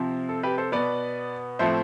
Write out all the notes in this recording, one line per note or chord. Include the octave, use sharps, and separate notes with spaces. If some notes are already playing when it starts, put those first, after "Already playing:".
Already playing: C3 F3 C4
A4
G4 B4
A4 C5
B2 B3 B4 D5
A2 F3 A3 C4 C5 E5